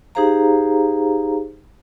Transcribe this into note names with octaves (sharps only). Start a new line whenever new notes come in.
D#4 G4 G#4 C5 F5 A#5